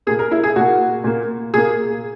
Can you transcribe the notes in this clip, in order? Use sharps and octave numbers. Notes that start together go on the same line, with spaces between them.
A#2 A#3 G#4
A#4
E4
G#4
A#2 A#3 F#4
A#2 A#3
A#2 A#3 G#4